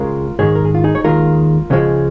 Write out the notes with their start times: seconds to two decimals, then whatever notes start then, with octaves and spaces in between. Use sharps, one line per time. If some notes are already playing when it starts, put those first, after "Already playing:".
Already playing: C#2 C#3 G#3 F4 A#4
0.39 G#2 D#3 G#3 G#4 C#5
0.55 A#4
0.65 G#4
0.74 F4
0.84 D#4 G#4
0.95 C#5
1.04 D#2 D#3 G#3 F4 A#4
1.70 C#2 C#3 F3 G#3